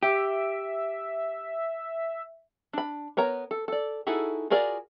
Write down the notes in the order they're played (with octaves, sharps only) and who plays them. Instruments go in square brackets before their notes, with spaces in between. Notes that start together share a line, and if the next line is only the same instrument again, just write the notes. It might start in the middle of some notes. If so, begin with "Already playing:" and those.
[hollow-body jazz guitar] G4 [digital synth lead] E5
[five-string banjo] D4 B5
B3 A#4 C#5 A#5
A4
A4 D5
D#4 E4 F#4 G#4 A4
F4 F#4 G#4 A#4 D5